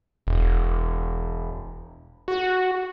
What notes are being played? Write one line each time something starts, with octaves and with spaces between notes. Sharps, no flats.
E1
F#4